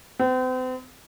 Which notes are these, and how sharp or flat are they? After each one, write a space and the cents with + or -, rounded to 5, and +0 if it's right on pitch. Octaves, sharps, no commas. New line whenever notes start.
C4 -40